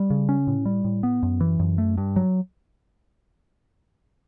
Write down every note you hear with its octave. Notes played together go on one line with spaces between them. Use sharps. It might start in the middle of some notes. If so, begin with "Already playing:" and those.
Already playing: G3
C#3
C#4
A2
G3
A2
B3
F#2
E3
F#2
A3
G2
F#3